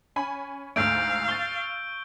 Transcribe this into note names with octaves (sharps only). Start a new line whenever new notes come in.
C#4 G#5 B5
D2 G#2 A3 F5 E6 G6 D7
C#6 G6 A6 G7